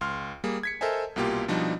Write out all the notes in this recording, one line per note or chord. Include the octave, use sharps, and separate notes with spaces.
C#2 C6 F6
G3 A#3 G#4
G#6 B6 C#7
A4 A#4 C5 D#5 E5 G#5
C2 B2 A#3 F4 G4
B2 F3 G3 D4 D#4